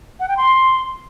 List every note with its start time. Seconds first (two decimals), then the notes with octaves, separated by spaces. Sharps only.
0.20 F#5
0.28 G5
0.37 C6